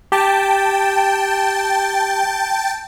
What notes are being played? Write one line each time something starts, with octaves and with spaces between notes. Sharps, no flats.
G4 G5 A5